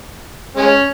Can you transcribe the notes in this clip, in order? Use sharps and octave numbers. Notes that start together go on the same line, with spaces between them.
G#3 C#4